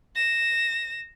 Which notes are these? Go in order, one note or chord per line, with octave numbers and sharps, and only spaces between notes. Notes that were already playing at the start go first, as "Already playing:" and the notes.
A#6 E7